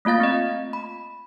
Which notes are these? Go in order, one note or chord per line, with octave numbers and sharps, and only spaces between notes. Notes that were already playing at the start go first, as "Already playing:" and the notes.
A3 A#3 F4 F5 A6
C4 D#5
B5